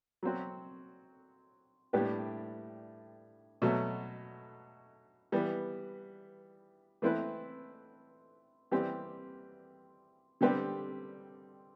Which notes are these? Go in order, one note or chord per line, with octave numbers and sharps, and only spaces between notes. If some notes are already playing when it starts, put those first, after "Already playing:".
F#3 C4 F#4
A2 G3 D4 G4 B4
B2 F#3 A3
E3 G3 B3
E3 A3 C4 E4 B4
E3 G3 C4 G4
D3 G3 C4 G4 B4